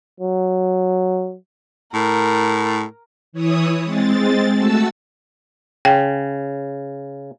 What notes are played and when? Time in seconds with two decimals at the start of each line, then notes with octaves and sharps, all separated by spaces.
0.20 F#3
1.94 A2 A#4
3.32 E3 E4 C#5 D#6
3.84 G#3 C4 A6
4.55 A3 F#4 A5 E6
5.85 C#3 G5